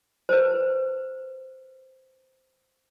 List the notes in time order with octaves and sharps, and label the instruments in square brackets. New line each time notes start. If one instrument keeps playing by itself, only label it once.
[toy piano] B4 C5